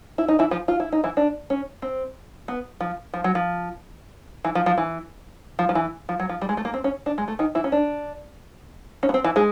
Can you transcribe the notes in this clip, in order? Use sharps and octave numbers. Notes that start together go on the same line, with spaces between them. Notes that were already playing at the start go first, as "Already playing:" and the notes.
E4
D#4
E3 E4
F3 F4
F4
E4
D#4
E3 E4
D4
C#4
C4
B3
F3
F3
F#3
F3
E3
F3
F3
E3
F3
F3
E3
F3
F#3
F3
G3
G#3
A3
A#3
C4
C#4
D4
G#3
A3
D#3 D#4
E3 E4
C#4
D4
C#4
B3
C4
E3 E4
G#3 G#4